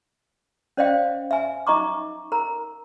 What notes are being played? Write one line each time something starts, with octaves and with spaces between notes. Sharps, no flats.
C#4 C5 D5 D#5 F5 G5
E5 G#5
D#4 D#5 A#5 C#6 D6
A#4 A#5